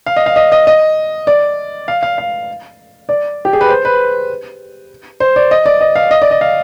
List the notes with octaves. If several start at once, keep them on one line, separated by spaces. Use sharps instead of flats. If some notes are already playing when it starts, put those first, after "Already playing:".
F5
D#5
F5
D#5
D#5
D#5
D5
F5
F5
F5
D5
G4
G#4
B4
C5
B4
C5
D5
D#5
D5
D#5
F5
D#5
D5
D#5
F5